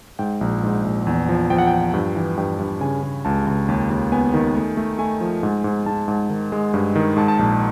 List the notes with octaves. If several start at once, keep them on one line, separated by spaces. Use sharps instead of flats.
G#2 G5
A#1
G#2
A#1
E2
F3
F3 G5
F#5
F3 G5
G2
E3
G2 G5
G2
C#3 G#5
C#3
C#2 A5
C#2
D#2
D#2
B3 G#5
D#3
A3
A3
A3 G#5
F3
G#2
G#2
G#2 A5
G#2
D#3
G#3
G2
D#3
G#2 A5
A5
A#1 A5